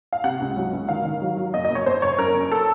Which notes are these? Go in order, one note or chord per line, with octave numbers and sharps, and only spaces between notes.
F5
C3 F#5
C#2
F#3
C#2
D#3 F5
D#3
F#3
F#3
F#1 D#5
D#5
F#1
C#5
F#1 C5
F#1 C#5
F#2 A#4
F#1
A4